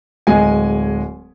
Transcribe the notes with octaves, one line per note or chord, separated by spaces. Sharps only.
D1 G#3 G#5